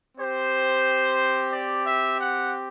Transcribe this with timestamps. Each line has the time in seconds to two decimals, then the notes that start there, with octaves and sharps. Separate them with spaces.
0.18 C4 G4 C5
1.51 D5
1.85 E5
2.19 F#5